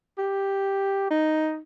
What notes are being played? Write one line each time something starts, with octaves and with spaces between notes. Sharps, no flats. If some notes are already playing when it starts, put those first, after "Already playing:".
G4
D#4